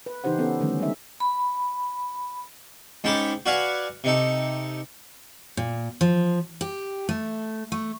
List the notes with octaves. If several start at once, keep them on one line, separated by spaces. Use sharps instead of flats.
B4
C#3 E3 D#4 G4 C5 F#5
B3 C#4 A4
D3 D#3 F3 G3 A3 C#4
G3 G#3 D#4 E5
B5
G#2 C#4 G5 A5 B5 D6
F#4 B4 D5 F5 F#5 G#5
C3 D#4 A4
A#2
F3
G4
A3
A3